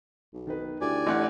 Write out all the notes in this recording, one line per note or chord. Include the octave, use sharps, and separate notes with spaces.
B1
D#3 D#4 B4
D2 D4 E4 G4 D5 G#5
A1 A2 F#5